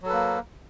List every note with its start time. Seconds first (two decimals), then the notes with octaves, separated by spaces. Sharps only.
0.03 F#3
0.06 A4
0.09 B4
0.13 A#3